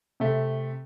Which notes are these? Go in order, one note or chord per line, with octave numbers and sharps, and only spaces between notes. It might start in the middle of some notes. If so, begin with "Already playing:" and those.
C3 A3